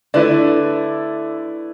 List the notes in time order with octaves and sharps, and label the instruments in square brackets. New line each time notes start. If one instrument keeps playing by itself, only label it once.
[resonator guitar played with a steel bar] D3 [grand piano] A3 E4 B4 D5